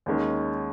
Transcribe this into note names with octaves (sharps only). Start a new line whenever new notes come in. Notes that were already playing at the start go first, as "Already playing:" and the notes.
D#2 D#3 G#3 C#4